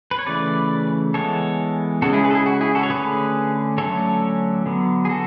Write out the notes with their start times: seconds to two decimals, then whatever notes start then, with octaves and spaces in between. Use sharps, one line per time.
0.11 B4
0.19 C#5
0.27 C#3 E3 A3 B4 D5
1.14 E3 G#3 B3 A4 C#5
2.02 C#3 G#3 C#4 F#4 A4
2.13 E4 G#4
2.24 G#4 B4
2.31 A4
2.35 E4 G#4
2.46 F#4
2.61 E4 G#4
2.75 F#4 A4
2.83 C#5
2.90 D3 A3 C#4 G#4 B4
3.77 D3 F#3 A3 C#4 A4 C#5
4.66 D3 F#3 B3
5.05 G#4
5.09 F#4 A4